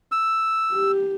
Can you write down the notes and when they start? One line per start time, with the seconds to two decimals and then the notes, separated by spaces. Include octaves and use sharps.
0.12 E6
0.72 G4